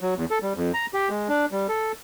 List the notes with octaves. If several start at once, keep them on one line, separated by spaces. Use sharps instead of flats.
F#3
E2
A4
G3
F2
A#5
G4
G#3
D4
G3
A4